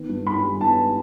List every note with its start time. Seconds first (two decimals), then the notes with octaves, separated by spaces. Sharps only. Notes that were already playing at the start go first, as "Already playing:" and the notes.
Already playing: D#3 B3
0.09 G2
0.26 D#3 B5
0.43 G3
0.61 B3 A5